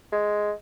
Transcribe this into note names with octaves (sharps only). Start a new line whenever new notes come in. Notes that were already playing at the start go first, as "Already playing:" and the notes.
G#3